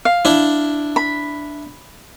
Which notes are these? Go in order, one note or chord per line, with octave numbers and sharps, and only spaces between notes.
F5
D4 E4
B5